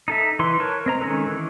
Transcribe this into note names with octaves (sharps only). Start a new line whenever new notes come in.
D#4 A4 E5
E3 D#4 C6
A#4 B4 C#5 A5
C4 D#5 A#5
D#3 G#3 C#4 A4 B4
D#3 E3